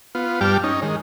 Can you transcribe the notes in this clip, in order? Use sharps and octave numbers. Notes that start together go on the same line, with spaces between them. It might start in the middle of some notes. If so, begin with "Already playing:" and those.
B3 F4
G2 G3 G5 A5 D6 F6
C#4 D#4
D#3 G#3